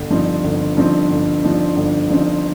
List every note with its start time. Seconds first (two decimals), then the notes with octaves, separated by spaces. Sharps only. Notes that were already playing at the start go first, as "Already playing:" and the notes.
Already playing: G1
0.10 G2 F3 C4 D#4
0.44 G1
0.77 G2 F3 C4 D#4
1.10 G1
1.43 G2 F3 C4 D#4
1.76 G1
2.09 G2 F3 C4 D#4